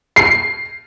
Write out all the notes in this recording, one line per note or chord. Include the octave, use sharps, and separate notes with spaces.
C7